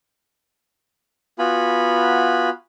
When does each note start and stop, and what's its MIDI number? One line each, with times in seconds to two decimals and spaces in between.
1.39 2.50 59
1.39 2.50 65
1.39 2.50 66
1.39 2.50 80
1.39 2.50 83